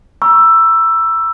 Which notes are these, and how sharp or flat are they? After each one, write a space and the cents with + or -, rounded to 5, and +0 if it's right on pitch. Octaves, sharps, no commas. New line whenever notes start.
A#5 +40 C#6 +0 E6 +10